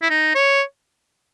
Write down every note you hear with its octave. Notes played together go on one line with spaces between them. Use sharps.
E4
D#4
C#5